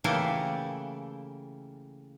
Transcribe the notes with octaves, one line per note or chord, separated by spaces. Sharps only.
C#3 E3 A3 A#3 E4 G4